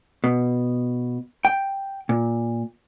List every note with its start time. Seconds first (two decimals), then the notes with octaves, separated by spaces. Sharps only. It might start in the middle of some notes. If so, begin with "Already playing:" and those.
0.24 B2
1.45 G5
2.09 A#2